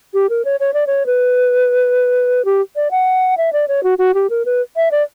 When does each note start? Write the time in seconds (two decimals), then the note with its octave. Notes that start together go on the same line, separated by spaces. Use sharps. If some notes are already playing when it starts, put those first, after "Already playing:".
0.14 G4
0.29 A#4
0.45 C#5
0.60 C#5
0.74 D5
0.87 C#5
1.06 B4
2.45 G4
2.76 D5
2.91 F#5
3.37 E5
3.53 D5
3.68 C#5
3.83 F#4
3.98 F#4
4.14 G4
4.30 A#4
4.45 B4
4.76 E5
4.91 D5